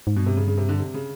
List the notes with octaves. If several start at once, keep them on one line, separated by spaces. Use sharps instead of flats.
G#2
G2 B2
C3
C#3
C#3
C3
D3
C3
C#3